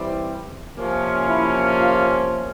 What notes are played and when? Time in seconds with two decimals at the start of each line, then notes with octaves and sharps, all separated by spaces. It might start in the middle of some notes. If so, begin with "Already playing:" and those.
Already playing: E3 G3 C4
0.76 C3 F3 A#3 C#4
1.29 E4
1.79 F4